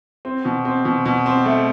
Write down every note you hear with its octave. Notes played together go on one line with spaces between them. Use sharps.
C4
B2
C4
B2
B2
C4
A3